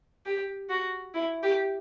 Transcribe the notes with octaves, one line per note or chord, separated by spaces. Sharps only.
G4
F#4
E4
G4